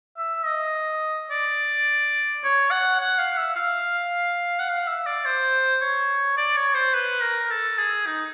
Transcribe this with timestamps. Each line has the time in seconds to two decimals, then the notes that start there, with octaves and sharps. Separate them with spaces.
0.17 E5
0.46 D#5
1.31 D5
2.44 C#5
2.71 F#5
3.00 F#5
3.18 F5
3.37 E5
3.56 F5
4.60 F#5
4.69 F5
4.87 E5
5.06 D5
5.25 C5
5.82 C#5
6.37 D5
6.57 C#5
6.75 C5
6.94 B4
7.22 A#4
7.50 A4
7.78 G#4
8.07 D#4